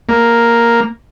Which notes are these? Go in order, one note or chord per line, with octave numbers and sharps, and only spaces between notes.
A#3